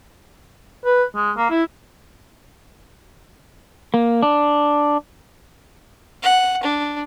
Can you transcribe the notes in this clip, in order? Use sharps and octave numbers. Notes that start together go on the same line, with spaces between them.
B4
G#3
A#3
E4
A#3
D4
F#5
D4